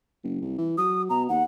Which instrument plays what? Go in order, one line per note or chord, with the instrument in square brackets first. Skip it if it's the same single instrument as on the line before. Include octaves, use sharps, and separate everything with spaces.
[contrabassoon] F#1
C2
E3
[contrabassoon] F#3 [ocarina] D#6
[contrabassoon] B2 [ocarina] A#5
[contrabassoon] D#2 [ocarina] F#5